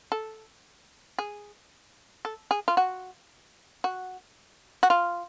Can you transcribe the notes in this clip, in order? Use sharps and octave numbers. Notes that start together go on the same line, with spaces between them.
A4
G#4
A4
G#4
F4
F#4
F#4
F#4
F4